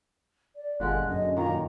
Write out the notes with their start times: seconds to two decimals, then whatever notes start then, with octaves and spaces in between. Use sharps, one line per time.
0.56 D5
0.80 G1 A#2 D3 G#3 F#6
1.08 F#2 D#5
1.37 A#2 D#3 A#5